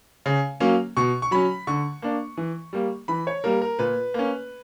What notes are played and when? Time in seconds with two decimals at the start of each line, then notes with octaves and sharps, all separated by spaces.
0.26 C#3
0.60 F#3 A#3 C#4
0.97 B2 C#6
1.22 C#6
1.31 F#3 C#4 B5
1.67 D3 C#6
2.02 A#3 D4
2.38 E3
2.73 G3 A#3
3.08 E3 B5
3.27 C#5
3.44 G3 A#3 A#4
3.62 A#4
3.79 A#2 B4
4.14 A#3 C#4